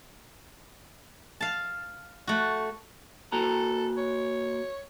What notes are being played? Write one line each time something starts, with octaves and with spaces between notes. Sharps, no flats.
F5 A5
A3 F#4
A#3 F#4 A4 A#5
C#5